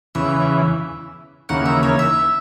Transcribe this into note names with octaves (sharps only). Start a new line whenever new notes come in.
E2 C#3 E3 E5
D#2 C#3 E3 A#3 F#5
E5
C#5
E5